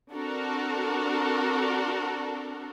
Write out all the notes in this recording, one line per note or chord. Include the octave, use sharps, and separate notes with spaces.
C4 D4 F#4 A4 A#4